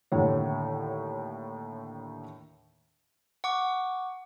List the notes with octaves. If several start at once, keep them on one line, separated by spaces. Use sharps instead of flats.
D#2 A2 D3 C#5
F#5 C#6 D6